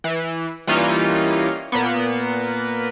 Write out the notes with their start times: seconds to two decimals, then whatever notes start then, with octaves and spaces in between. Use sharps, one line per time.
0.04 E3
0.67 E3 G3 A#3 C#4 D#4 F4
1.72 A#2 A#3 B3